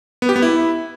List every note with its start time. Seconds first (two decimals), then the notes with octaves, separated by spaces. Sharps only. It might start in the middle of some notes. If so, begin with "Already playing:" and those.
0.22 B3
0.29 G4
0.36 B3
0.42 E4